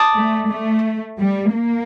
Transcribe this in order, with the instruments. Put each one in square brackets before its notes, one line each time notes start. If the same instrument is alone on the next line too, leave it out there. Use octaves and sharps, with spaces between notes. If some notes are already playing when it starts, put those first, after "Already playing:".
Already playing: [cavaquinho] D5 A5 D#6
[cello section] A3
A3
G3
A#3